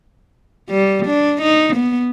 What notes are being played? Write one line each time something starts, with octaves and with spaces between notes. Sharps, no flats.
G3
D4
D#4
B3